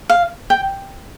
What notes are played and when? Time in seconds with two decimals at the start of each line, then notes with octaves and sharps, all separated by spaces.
0.10 F5
0.50 G5